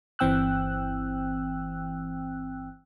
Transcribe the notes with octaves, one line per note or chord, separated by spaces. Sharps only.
G1 E3 C4 G5 E6 F#6